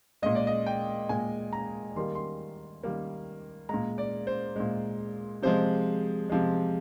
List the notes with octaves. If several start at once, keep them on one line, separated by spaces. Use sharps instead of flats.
A#2 G#3 D#5
D5
D#5
G5
A#2 G#3 G#5
A#5
D#3 G3 A#3 C6
C6
D#3 G3 A#3
A#2 G#3 A#5
D5
C5
A#2 G#3
C3 F3 G#3 C5
C3 F3 G#3